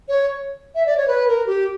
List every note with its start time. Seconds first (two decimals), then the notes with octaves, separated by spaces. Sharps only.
0.09 C#5
0.75 E5
0.86 D5
0.97 C#5
1.08 B4
1.28 A#4
1.46 G4